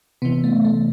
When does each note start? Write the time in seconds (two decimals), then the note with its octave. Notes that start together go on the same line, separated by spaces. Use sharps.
0.22 C3 E3 B3
0.44 A3
0.65 A3